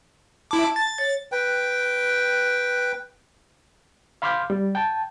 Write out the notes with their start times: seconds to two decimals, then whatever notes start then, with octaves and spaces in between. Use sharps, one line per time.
0.51 E4 A5 D6
0.76 A6
0.99 C#5
1.32 B4 G5
4.22 F5 B5 C6 D6 F6 G6
4.50 G3
4.75 G5 A5